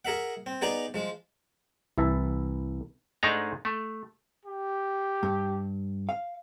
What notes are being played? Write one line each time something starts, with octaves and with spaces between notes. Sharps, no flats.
G#4 A#4 E5 F#5
C4
B3 D#4 G#4 D5 G#5 A#5
F3 G#3
C2 E3 E4 E5 A5
G#2 G#3 A3 D4 D#4 A#5
A3
G4
G2
F5